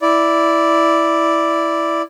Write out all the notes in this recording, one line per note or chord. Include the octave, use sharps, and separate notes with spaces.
E4 D5